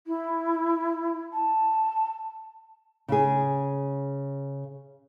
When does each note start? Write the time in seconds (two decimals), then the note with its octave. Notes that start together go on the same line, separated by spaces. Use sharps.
0.07 E4
1.33 A5
3.08 C#3 G#4